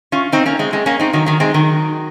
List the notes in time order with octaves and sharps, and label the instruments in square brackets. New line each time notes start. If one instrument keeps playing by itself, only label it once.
[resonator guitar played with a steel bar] C#4 F4
C4 D#4
A#3 C#4
G#3 C4
G#3 C4
A#3 C#4
C4 D#4
D#3 F#3
D#3 F#3
G#3 C4
D#3 F#3